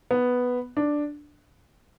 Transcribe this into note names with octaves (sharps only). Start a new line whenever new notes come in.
B3
D4